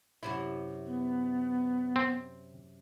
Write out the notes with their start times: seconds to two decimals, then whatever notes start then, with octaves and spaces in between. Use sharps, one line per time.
0.23 F#2 C3 E4
0.87 B3
1.96 C4